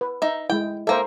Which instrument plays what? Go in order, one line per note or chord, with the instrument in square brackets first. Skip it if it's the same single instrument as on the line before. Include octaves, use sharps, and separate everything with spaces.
[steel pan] B4
[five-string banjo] D#4 E5
[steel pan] G#3 E4 [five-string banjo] G5
[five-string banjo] A#3 E5 [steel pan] A4 A#4 C5